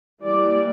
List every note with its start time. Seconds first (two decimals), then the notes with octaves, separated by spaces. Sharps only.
0.21 E3 G3 A#3 D5